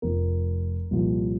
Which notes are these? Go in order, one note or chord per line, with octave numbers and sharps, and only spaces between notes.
F1 F2 F3 A#4
C2 A#2 F3